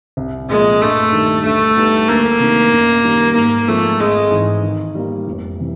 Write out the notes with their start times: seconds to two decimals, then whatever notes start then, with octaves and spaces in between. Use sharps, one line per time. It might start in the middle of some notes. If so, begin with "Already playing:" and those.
0.17 C2
0.49 A#2 F3 G#3 A#3
0.81 G2 A3
1.12 D#3 G3
1.44 D2 A3
1.76 D3 G3 B3 D#4
2.08 D2 A#3
2.40 C3 D#3
2.72 F#2
3.03 D#3 G3
3.35 G#2 A#3
3.67 F3 G#3 A3 C4
3.99 G#1 G#3
4.31 G#2 E3
4.63 D#3
4.95 G3 A#3
5.27 F1
5.59 C3 E3